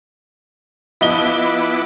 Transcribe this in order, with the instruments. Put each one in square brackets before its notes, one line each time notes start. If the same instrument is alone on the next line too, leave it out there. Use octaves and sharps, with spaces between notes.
[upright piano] F3 D#5 G7 [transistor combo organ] B3 E4 D6